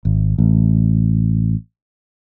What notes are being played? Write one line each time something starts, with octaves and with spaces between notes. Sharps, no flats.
G#1
A1